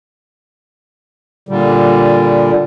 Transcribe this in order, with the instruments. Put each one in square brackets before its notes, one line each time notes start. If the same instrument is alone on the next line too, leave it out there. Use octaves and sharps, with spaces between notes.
[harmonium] A#2 D3 G3